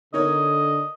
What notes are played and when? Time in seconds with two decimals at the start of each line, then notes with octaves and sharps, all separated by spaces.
0.14 D3 D#4 A#4 C#5 D#5